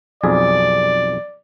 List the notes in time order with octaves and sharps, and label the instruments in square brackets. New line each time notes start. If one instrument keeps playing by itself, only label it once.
[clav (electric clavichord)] B1 F2 G#4 [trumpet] D5